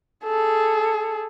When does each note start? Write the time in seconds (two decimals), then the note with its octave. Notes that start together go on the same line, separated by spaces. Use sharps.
0.25 G#4 A4